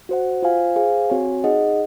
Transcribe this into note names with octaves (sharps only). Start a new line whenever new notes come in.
F#4 C5 F#5
F4 C5 F5 G#5
G#4 C5 F5 G#5
C4 F#4 C#5 G#5
D#4 G#4 D#5 F#5